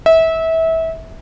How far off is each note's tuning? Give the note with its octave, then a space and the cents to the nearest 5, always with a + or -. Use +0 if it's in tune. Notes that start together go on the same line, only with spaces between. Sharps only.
E5 -25